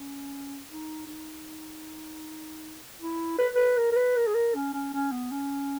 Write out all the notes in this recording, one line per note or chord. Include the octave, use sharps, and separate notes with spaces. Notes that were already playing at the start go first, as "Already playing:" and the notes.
Already playing: C#4
D#4
D#4
E4
B4
B4
A#4
A#4
B4
A#4
G#4
A#4
C#4
C#4
C#4
B3
C#4